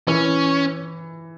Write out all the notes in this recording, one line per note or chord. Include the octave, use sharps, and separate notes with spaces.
E3 C#4